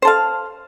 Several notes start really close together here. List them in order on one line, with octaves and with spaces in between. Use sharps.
C5 A4 F5